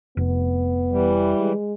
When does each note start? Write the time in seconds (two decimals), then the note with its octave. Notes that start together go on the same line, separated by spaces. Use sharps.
0.17 F1 B3
0.92 E3 G3
1.40 G#3